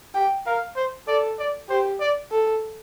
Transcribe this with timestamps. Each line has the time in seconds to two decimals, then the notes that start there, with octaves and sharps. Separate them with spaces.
0.14 G4 G5
0.46 A#4 F5
0.76 C5
1.07 A4 D5
1.38 D5
1.69 G4 C5
2.00 D5
2.31 A4